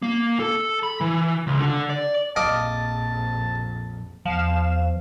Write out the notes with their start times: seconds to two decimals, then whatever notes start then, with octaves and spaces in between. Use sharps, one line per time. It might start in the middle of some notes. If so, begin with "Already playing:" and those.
0.02 A#3
0.40 A4
0.83 B5
1.01 E3
1.47 C#2
1.59 D3
1.90 D5
2.36 A#1 F2 D#5 F5 A5 D6
4.25 E2 F3 F5 E7